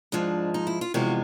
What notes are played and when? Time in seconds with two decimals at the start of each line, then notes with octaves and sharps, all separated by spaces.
0.12 G#2 F3 G#3 D4
0.54 D#4
0.67 E4
0.81 F4
0.94 E2 C3 F3 G#3 F#4